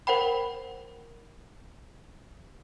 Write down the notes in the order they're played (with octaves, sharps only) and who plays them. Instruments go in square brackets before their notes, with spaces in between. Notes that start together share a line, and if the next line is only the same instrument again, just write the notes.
[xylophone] A#4 C5 F#5 G5 B5